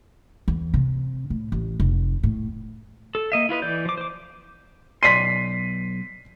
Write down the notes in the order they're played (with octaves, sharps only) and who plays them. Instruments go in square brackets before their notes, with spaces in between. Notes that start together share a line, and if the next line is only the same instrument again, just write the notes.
[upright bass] E2
C3
A2
A1
F1
A2
[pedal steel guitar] A4
A#3 D#5 E5
E4 F4 B4 D#5
E3 D5 G6
F3 D6
C5 D6
[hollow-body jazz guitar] B1 D5 C6 [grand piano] B6 C7 D#7